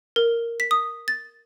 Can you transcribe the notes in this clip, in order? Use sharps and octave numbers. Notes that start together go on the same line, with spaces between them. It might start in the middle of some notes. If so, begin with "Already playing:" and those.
A#4
B6
D#6
A6